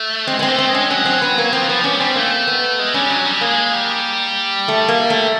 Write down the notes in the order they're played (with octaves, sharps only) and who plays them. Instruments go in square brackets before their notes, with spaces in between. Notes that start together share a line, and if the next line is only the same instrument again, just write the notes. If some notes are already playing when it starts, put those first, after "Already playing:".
Already playing: [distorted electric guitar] A3
[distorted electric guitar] G#3 [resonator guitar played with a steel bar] C4
[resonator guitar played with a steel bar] B3
C4
[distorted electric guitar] A3
[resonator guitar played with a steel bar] C4
[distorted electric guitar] G#3
[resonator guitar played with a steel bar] C#4
[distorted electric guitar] F#3 [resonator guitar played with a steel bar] C#4
[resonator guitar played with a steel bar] C4
B3
A#3
[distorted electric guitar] F3 [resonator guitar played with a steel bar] C4
[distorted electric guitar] F3 [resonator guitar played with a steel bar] B3
[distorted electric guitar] G3 [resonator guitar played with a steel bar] C#4
[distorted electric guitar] G3 [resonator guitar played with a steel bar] C4
[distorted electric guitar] A3 [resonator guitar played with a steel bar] A#3
[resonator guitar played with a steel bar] B3
[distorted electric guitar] G#3
[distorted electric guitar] G3 [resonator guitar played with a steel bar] C#4
[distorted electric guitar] F#3 [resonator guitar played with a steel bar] C#4
[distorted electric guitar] G3
[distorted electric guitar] G#3 [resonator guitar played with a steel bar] A#3
[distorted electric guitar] G3
[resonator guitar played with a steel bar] A3
A#3
A3